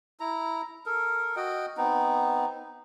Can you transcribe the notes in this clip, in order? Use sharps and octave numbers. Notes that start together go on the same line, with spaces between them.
E4 A#5
A4 A#4
F#4 D#5 G5
B3 C4 D#4